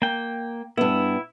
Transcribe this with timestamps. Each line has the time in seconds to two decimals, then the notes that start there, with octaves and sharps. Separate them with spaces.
0.02 A#3 G5
0.77 G2 B3 E4